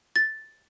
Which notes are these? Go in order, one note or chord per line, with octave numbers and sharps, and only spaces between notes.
A6